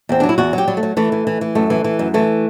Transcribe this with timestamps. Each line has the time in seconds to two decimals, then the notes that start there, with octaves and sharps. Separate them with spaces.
0.09 E2 C4
0.20 F#3 D4
0.29 E4
0.38 E2 F#4
0.53 F#3
0.58 G4
0.68 F#3 G3
0.77 A3
0.83 F#3
0.97 E3 A3
1.12 E3
1.27 E3
1.41 E3
1.55 F#2 A3
1.70 E3
1.84 E3
1.99 F#2
2.14 E3 A3